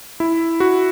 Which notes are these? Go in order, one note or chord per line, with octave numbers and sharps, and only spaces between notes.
E4
F#4